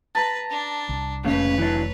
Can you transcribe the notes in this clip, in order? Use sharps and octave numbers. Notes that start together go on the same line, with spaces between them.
B4 A5 A#5
D4
C2
F1 A#2 C#3 A3 B4 C#5
E3 F#3 D4